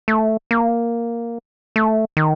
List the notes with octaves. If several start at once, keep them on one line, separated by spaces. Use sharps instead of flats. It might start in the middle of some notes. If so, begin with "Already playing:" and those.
A3
A#3
A3
D#3